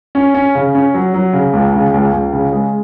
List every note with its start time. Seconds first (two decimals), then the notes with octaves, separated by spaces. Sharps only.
0.15 C#4
0.35 C#4
0.55 C#3
0.75 C#4
0.94 F#3
1.14 F#3
1.33 C#3
1.53 C#2
1.73 C#3
1.94 C#2
2.13 C#2
2.33 C#3
2.53 G#3